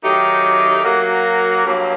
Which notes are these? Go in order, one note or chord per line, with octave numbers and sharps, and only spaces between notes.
D#3 F#3 A3 D#4 G4
F#3 A#3 F#4 A#4
G2 F#3 A#3